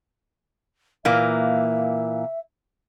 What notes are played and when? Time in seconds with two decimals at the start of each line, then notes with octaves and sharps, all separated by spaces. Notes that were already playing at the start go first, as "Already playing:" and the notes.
1.05 A#2 E3 A#3 E5